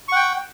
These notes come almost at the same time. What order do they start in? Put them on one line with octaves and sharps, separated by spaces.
C#6 F#5 G5